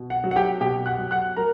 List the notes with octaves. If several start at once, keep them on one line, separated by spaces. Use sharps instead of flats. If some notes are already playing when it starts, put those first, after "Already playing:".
Already playing: B2
F#5
F#3
F#5
G4 G5
B2 G4 G5
F#5 F#6
F#3
F#5 F#6
F#3 A#4 A#5